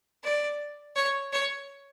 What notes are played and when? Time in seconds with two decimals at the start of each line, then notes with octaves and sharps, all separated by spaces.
0.24 D5
0.95 C#5
1.32 C#5